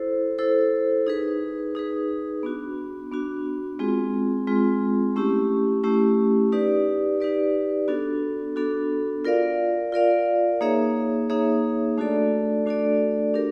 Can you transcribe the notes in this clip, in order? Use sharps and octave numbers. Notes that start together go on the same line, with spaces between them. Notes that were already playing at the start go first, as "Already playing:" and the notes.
Already playing: E4 A4 C5
E4 A4 C5
D#4 G#4 B4
D#4 G#4 B4
B3 D4 F#4
B3 D4 F#4
G#3 C4 F4 G#4
G#3 C4 F4 G#4
A3 C#4 E4 G4
A3 C#4 E4 G4
D#4 G4 B4 D5
D#4 G4 B4 D5
B3 D4 F#4 A4
B3 D4 F#4 A4
F4 A#4 D5 F5
F4 A#4 D5 F5
A#3 D#4 G#4 C#5 E5
A#3 D#4 G#4 C#5 E5
A3 D4 F#4 A4 D5
A3 D4 F#4 A4 D5
D4 G4 A#4